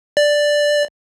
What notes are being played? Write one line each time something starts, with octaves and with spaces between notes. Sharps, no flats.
D5